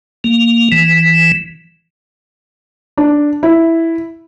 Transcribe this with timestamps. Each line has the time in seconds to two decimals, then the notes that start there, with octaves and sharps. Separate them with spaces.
0.24 A#3
0.72 E3
2.97 D4
3.43 E4